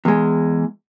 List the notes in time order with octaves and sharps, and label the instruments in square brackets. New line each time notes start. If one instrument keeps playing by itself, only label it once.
[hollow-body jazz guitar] E2 G#3